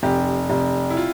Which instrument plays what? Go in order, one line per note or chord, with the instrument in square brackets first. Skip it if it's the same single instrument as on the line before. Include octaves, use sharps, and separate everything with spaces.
[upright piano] F1 [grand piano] G4
[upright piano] F1
[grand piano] E4
F4